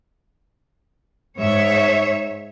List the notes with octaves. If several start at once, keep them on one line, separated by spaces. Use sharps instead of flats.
G#2 C#5 E5